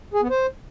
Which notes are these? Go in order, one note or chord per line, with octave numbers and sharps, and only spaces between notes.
G#4
B3
C5